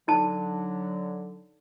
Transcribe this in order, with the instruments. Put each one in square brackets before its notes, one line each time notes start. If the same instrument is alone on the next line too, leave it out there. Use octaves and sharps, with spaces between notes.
[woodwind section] D3 F#3 [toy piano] D#4 A5